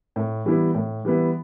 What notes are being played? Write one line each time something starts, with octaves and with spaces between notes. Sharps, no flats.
A2
E3 G3 B3 E4
A2
E3 G3 B3 E4